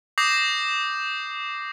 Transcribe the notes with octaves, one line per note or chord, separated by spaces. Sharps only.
D6 D#6 G6 A#6 C7